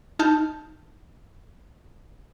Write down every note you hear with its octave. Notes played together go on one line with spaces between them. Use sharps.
D#4 A5 F6 G6